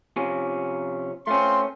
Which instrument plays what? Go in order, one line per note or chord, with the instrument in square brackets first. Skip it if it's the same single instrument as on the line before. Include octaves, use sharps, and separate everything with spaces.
[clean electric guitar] C3 F3 C#4
[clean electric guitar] A3 C#4 [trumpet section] C4 F4 C6